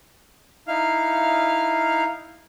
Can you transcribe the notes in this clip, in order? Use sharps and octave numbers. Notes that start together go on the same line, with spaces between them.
D#4 E4 F5 F6